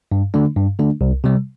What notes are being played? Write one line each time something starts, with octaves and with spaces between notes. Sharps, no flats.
G2
D3 A3 D4
G2
D3 A3 D4
C2
C3 G3